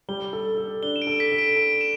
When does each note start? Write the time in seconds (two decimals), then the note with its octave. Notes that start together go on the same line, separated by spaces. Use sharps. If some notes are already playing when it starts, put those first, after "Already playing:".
0.09 G3 G7
0.33 A4
0.58 A4
0.83 D4 G7
0.96 E7
1.02 D7
1.07 A4
1.20 B6
1.32 A4
1.38 D7
1.56 A4 D7
1.81 E7